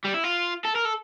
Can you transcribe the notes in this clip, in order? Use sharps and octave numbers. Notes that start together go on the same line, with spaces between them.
G3
E4
F4
A4
A#4
A4